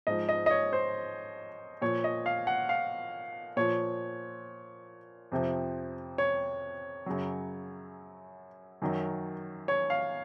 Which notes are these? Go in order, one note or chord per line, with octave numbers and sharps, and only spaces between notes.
G#2 F3 D#5
D#5
D#5
C#5
C5
A#2 F3 C#5
D#5
F5
F#5
F5
A#2 F3 C#5
F2 C3 F3
C#5
F#2 C#3 F#3
F#2 D#3 F#3
C#5
F5